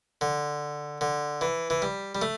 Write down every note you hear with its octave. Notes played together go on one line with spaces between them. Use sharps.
D3
D3
E3
E3
G3
G3
A3